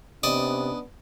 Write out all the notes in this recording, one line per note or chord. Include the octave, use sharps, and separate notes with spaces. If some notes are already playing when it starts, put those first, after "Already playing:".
C3 B3 C#4 D4 D5 D#5